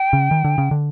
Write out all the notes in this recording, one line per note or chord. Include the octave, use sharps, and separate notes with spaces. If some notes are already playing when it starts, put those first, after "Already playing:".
Already playing: G5
C#3
D#3
D3
C#3
D3